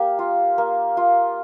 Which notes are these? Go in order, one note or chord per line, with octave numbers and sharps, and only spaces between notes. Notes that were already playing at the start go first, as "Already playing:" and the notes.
Already playing: A#3 G4
F4
A#3
F4